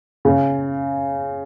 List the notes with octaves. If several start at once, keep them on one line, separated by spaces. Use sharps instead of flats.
C#3